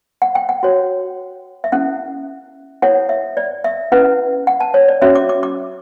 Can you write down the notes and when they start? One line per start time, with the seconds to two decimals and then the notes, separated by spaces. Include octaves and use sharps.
0.22 F#5
0.35 G5
0.49 F#5
0.63 F#4 C#5
1.64 E5
1.72 C#4 E4 A4 F#5
2.82 E4 A4 C#5 F#5
3.09 E5
3.37 D5
3.64 E5
3.92 C#4 E4 B4 F#5
4.47 F#5
4.60 A5
4.74 C#5
4.88 D5
5.02 C#4 F#4 C#5 E5
5.15 D6
5.29 D6
5.43 D6